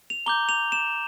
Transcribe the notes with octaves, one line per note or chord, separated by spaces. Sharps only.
F7
A#5 D6 G6 G7
F7
E7